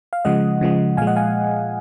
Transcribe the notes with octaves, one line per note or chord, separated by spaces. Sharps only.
F5
C#3 F3 G#3 D#5 F#5
C#3 F3 G#3
A#2 F3 G#3 F5 G#5
D#5 F#5
F5 G#5